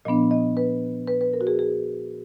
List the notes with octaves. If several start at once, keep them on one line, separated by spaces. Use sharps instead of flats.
A#2 F3 B3 D4 D#5
D#5
B4
B4
B4
A#4
F#4
G#4
G#4